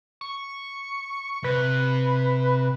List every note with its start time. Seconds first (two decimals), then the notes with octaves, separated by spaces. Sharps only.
0.21 C#6
1.44 C3 B4